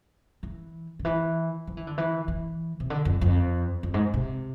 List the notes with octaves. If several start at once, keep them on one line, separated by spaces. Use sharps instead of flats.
E3
D3
E3
F3
E3
D3
E3
E3
C3
D3
F2
F2
F2
G#2
C3